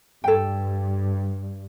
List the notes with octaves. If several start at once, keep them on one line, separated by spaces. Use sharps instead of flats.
G2 A4 G5